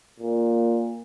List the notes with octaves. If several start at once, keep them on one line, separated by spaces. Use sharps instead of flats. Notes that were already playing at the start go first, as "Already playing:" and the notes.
A#2